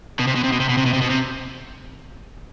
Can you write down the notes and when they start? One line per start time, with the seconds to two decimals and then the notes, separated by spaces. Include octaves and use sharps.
0.20 B2
0.28 C3
0.36 B2
0.44 C3
0.52 B2
0.60 C3
0.69 B2
0.77 C3
0.86 B2
0.93 C3
1.01 B2
1.10 C3